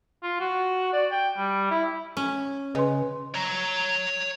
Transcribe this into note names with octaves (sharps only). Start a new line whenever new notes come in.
F4
F#4
D5
G5
G3
E4
C#4
C#3 B4 D#5 G#5 C6
C#5 A#5